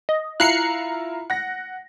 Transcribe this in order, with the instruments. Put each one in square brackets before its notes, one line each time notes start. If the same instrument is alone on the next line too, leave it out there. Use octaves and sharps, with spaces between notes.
[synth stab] D#5
[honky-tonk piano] E4 F4 A#5 [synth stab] F#6 C7 C#7
[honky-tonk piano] F#5 A#6